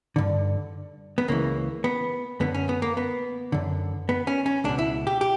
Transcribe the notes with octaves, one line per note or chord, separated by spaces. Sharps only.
G2 D3
B3
C#2 C#3 E3 A#3
B3
F#2 D3 B3
C#4
B3
A#3
B3
F#2 D3
B3
C#4
C#4
C#2 B2 D4
E4
G4
G4